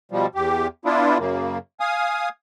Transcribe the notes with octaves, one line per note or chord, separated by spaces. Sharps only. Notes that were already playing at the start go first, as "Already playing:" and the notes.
B2 F3 G3
E2 G4
B3 D4 E4 F4
F#2 C#3 A#3
F5 G#5 D#6